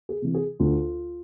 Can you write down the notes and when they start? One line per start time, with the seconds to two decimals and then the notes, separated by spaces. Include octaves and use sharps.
0.09 G#4
0.22 C3 E3
0.34 G#4
0.60 D2 F4